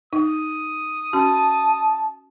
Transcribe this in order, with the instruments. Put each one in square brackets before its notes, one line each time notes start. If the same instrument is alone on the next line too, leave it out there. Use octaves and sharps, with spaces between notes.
[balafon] D#4 [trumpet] D#6
[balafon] C#4 F#4 [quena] A5